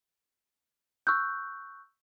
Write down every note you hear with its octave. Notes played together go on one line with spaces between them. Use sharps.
C#6 E6 F#6 G6